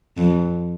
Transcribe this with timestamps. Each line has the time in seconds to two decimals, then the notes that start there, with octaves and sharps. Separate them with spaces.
0.17 F2